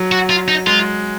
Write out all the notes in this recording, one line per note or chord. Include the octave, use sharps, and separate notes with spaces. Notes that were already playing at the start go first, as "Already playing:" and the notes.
Already playing: F#3
F#4
F4
D#4
G#3 F4